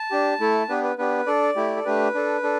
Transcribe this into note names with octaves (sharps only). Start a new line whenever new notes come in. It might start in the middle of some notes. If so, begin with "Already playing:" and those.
Already playing: A5
D4 G4
A3 E4 A4
B3 D4 G4 B4
B4
B3 D4 G4 B4
D4 A4 D5
A3 E4 G4
A4
A3 D4 G4 B4
D4 A4
D4 A4